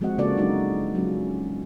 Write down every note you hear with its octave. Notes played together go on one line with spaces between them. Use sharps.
F3 G#3 C4 F#4 D#5 F#5
C#3 A#3 F4 F#4 A4 D5
F#3 G#3 D4 D#4 F#4
F#3 G#3 C#4 F4